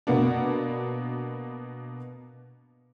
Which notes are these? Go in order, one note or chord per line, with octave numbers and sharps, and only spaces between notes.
B2 A#3 B3 D4